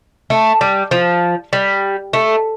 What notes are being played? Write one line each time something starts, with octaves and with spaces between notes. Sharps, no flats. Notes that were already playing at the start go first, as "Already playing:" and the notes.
A3
G3
F3
G3
A3